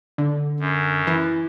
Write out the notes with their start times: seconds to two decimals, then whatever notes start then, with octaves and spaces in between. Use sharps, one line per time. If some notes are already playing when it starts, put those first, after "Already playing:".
0.18 D3
0.60 F#2
1.07 E3